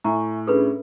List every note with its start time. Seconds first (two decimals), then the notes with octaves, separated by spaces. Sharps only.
0.04 A2 E5 G#5 A#5 C#6
0.47 C#4 D4 G#4 A4 B4 B5